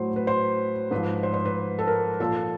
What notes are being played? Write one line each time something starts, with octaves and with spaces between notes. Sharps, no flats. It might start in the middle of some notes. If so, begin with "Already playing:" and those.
Already playing: A2 F#3 C5
B4
C5
G#2 F3 B4
C5
C5
B4
A4
A#4
A#2 F3 A4